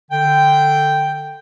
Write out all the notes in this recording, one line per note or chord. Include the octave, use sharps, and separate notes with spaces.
D3 G5